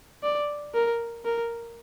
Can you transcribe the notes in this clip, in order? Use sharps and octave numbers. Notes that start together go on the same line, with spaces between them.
D5
A#4
A#4